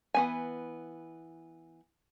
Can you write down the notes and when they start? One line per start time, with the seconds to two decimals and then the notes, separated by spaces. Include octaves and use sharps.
0.14 E3 B3 G#5